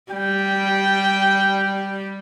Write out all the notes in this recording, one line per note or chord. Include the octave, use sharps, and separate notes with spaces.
G3 G5